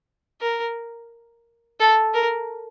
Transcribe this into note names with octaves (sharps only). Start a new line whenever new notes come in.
A#4
A4
A#4